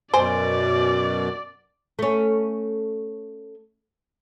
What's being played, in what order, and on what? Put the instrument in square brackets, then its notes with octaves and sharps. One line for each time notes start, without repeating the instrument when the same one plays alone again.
[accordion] F#2 B2 [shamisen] C5 [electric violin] D5 [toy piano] G#5
[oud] A3 C#4